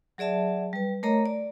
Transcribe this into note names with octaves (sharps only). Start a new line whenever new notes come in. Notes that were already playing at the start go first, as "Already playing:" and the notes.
F#3 G#4 D5 E5 A5
G3 B4
A3 A#4 C#5 D#5 A#5
D5